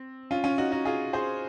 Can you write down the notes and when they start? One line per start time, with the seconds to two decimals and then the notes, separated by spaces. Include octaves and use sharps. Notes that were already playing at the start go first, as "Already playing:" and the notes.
Already playing: C4
0.31 C#4 F4
0.44 C#4 F4
0.58 D#4 F#4
0.72 D#4 F#4
0.85 F4 G#4
1.13 G#4 C5